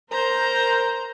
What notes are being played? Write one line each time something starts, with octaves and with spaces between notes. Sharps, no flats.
A#4 C5 A#5